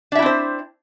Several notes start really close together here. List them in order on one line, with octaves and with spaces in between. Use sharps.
D4 E5 E4 C4 C5